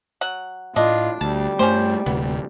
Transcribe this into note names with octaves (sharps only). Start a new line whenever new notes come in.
F#3 F#5
A2 D4 F4 D#5
D2 G3 A5
G2 A3 C#4 G4 C5
D1 D2 C3 B3